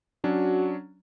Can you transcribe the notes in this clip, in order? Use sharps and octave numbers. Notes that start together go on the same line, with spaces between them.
F#3 C#4 D4 F#4